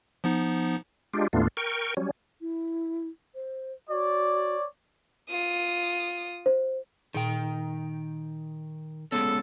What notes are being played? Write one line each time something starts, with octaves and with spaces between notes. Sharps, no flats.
F3 B3 D#4
G#3 D4 F4 G4
D#2 A2 A3 B3 D4 F4
A#4 G5 C#6
F#3 G3 C#4
E4
C5
F#4 C#5 D5
F4 D#6
C5
A#2 D#3 G5
G#3 B3 C#4 A4